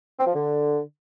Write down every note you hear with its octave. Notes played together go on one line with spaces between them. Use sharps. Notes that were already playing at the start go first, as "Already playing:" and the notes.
C4
F3
D3